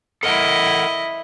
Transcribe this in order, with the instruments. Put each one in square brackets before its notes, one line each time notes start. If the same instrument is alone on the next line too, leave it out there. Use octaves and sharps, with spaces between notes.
[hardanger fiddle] E4 D#5 [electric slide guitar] A4 A#4 F#5